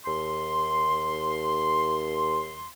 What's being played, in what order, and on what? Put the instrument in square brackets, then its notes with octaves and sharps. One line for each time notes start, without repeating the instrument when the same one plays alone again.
[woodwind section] D#2 C6